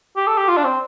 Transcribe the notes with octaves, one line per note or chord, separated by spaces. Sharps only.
G4
A4
G4
F4
D4
C4